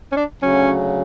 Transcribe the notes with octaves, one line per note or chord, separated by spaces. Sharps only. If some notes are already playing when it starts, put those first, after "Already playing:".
C#4
D4
D2 C#3 F#3 C#4